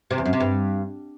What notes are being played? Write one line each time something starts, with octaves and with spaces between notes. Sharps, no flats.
C3
E2
F#2
C3
G2